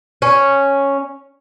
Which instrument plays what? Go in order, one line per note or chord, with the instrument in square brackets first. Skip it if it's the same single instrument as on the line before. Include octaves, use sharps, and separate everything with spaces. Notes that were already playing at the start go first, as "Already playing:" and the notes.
[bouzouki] C#4